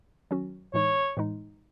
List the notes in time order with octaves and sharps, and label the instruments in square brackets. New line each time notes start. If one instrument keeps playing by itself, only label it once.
[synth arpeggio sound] D#3 F#3 C#4 F#4
[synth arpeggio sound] A2 E3 G#3 D#4 [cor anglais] C#5
[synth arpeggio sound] A2 E3 G#3 D#4